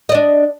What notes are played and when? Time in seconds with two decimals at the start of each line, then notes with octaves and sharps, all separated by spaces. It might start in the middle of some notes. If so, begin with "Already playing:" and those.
0.09 D#5
0.12 D5
0.14 D4